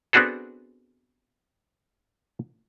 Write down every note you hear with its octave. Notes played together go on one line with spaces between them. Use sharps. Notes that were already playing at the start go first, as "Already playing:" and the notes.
B3 C4 D4 F#4 G#4 A4